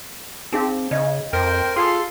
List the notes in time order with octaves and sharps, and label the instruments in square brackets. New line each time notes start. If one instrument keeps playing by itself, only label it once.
[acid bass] C4 [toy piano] D#4 G#4 F5
[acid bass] C#3 [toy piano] D5 D#5
[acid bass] F2 [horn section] A#4 C5 G5
[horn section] F4 A4 C6 [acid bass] G#4